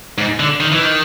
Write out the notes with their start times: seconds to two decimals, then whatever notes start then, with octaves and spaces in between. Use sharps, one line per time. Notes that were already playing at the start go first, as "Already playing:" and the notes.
0.18 G#2
0.40 D3
0.60 D#3
0.72 E3
0.82 D#3